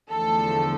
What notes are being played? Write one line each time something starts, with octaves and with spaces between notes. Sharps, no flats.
E2 D3 F3 A3 A4